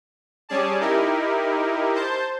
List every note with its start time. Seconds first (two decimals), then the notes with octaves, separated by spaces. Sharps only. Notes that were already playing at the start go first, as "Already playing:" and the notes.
0.49 G3 C#4 G#4 D5 A5
0.80 D#4 E4 G4 A#4
1.95 C5 A5 G6